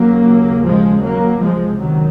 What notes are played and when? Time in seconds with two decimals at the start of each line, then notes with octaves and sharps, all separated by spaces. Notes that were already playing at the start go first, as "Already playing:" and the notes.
Already playing: D#2 C#3 F#3 A#3
0.65 F3 G#3
1.03 F#3 A#3
1.41 C#2 C3 F3 G#3
1.80 D#3 F#3